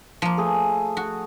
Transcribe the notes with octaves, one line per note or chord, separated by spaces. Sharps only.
F3 A#3
A3 G#4
F#4